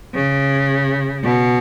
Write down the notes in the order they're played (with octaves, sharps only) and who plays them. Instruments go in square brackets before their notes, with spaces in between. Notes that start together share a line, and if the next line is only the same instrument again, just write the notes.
[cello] C#3
B2